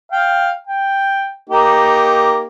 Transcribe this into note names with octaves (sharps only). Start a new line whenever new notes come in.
F5 G5
G5
A#3 D#4 G4